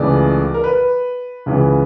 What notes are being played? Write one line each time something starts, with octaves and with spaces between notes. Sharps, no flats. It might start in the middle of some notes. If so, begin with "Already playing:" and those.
Already playing: C#2 C#3 E3 A3 D5
A#4
B4
C#2 C#3 E3